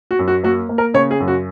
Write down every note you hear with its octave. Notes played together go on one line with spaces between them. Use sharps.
F#4
F#2
F#4
A#3 F#4
A#3
A#4
C#3 C#5
G#4
F#2
F#4